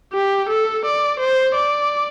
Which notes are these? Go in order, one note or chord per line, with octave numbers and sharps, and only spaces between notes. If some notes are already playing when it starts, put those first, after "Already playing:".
G4
A4
D5
C5
D5